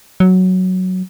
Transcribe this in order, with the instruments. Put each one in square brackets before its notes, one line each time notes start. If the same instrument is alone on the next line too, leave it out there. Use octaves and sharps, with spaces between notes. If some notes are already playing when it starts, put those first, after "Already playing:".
[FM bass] F#3